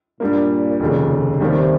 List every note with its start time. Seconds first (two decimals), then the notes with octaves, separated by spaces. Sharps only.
0.20 G2 A#2 G3 A#3
0.80 F1 D#2 C#3
1.40 D#2 C3 D#3 G3 A#3